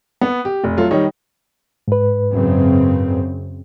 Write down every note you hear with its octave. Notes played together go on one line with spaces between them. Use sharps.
B3
G4
F1
F#3 A3 F4
D#3 G3 D#4 C#5
G#2 B4
F#2 C#3 C4